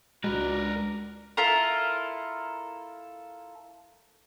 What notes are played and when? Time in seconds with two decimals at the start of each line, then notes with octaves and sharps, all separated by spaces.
0.24 C#2 G#3 D4 F#4 A#4 B4
1.37 E4 F4 A4 A#4